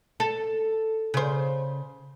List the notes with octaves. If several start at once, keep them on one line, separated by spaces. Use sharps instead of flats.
A4
C#3 C5